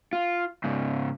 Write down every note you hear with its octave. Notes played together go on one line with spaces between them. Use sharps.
F4
G#2 C#3